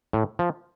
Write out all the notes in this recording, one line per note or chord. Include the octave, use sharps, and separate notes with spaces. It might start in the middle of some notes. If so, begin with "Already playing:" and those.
A2
F3